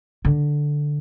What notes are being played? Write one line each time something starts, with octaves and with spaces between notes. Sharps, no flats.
D3